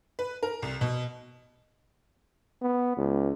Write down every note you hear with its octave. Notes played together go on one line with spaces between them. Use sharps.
B4
A#4
C2
B2
B3
C#2